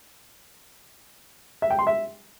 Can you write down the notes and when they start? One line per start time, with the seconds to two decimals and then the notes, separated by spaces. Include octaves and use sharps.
1.62 E5
1.70 G5
1.79 C6
1.87 E5